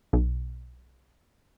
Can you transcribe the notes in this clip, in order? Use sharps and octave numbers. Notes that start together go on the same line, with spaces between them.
B1